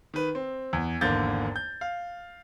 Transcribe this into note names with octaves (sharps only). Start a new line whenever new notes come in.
D#3 B4
C4
E2
G#1 E2 D3 A#3 G6 A6
G6
F5